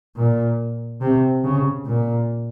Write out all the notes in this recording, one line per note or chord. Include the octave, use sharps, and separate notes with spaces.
A#2
C3
C#3
A#2